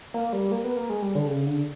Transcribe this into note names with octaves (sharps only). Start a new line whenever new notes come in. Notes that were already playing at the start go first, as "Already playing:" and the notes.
A#3
G3
A#3
B3
A#3
G#3
G3
D3
C#3
D3